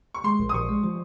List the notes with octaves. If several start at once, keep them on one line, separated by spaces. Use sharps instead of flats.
C#6
G#3 C6
A#1
D#6
A#1 C#6
G#3
F3